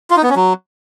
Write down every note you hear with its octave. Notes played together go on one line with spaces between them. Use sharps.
F4
D#4
B3
C#4
F#3